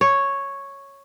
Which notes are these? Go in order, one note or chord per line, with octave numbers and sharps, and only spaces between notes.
C#5